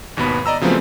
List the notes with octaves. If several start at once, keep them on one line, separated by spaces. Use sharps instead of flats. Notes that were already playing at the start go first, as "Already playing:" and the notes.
G#1 D#2 B2 B3 B5
D5 D#5 A#5 E6
C#3 F3 F#3 A3 B3 C4